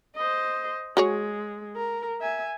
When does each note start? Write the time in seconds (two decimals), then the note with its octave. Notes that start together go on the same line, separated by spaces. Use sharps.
0.16 C5 D#5
0.97 G#3 F#4 G#4 C#5
1.76 A#4
2.21 E5 G#5